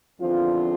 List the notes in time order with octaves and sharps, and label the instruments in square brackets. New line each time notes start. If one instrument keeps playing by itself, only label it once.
[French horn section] E2 D3 F3 C4 F4